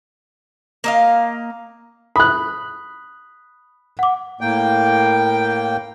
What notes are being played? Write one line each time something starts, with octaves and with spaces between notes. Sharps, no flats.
A#3 D#5 F5
B5 D#6 F#6
F#5 D6
A2 A#3 G5